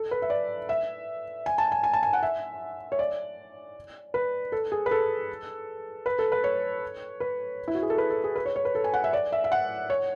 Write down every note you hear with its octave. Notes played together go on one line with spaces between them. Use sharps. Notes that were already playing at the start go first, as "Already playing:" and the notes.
Already playing: A4
B4
E5
D5
E5
G#5
A5
G#5
G#5
A5
G#5
F#5
E5
C#5
D5
B4
A4
G#4
B4
A4
B4
A4
B4
C#5
B4
E4
F#4
G#4
A4
B4
A4
G#4
B4
C#5
C#5
B4
A4
G#5
F#5
E5
D5
E5
E5
F#5
C#5